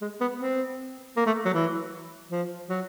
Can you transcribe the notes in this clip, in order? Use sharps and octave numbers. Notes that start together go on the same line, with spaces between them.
G#3
B3
C4
A#3
A3
F#3
E3
F3
F#3